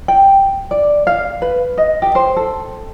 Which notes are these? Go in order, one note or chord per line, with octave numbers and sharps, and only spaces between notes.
G5
D5
F5
B4
D#5
G4
C5
A4